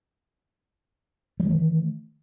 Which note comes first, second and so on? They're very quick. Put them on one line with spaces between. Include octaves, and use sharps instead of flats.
G3 E3 D#3 A3